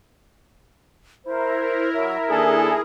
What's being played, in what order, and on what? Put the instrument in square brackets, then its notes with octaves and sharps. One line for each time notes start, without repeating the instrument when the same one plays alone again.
[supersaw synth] E4 A#4 [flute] C5
[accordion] F#3 [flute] E5
[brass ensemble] D#2 D4 A4 [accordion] G#4